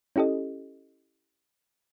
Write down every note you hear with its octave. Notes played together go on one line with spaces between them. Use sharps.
C#4 E4 G4 A4 D#5